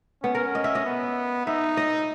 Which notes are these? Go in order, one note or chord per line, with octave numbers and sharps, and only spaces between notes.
B3 C#4
A#4
D#5
E5
D#5
B3
D#4 E5
D#5